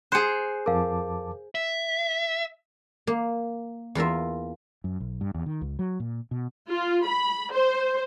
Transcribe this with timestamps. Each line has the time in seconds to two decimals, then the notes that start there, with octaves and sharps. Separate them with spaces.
0.12 G#4 C5 F#6 C#7 D#7
0.66 F2 A#4 F5 A5 D6
1.55 E5
3.07 A#3
3.95 E2 F4 A#4 E5
4.84 F#2
5.00 B1
5.21 G2
5.34 E2
5.46 D#3
5.61 C#2
5.79 F#3
6.00 A#2
6.31 B2
6.70 F4
7.07 B5
7.53 C5